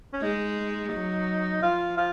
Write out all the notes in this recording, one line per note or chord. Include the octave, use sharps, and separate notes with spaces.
C#4
G#3 D#4
F#3
F3 F4
F4